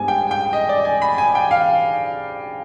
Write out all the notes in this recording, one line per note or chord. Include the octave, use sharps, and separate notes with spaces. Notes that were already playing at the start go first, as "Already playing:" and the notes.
Already playing: G#2 G3 B3 D4 G#5
G5
G5
D#5
D5
G#5
B5
G#5
G5
F5